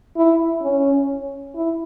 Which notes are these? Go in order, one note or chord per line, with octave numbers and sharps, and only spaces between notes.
E4
C#4
E4